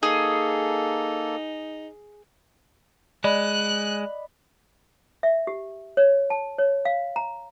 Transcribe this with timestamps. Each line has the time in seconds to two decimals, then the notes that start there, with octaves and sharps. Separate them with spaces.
0.03 A#3 D#4 G#4 A4
3.24 G#3 D5 D#5 B5 F#6
5.23 E5
5.47 G4
5.97 C#5
6.30 A5
6.58 C#5
6.85 F5
7.16 A#5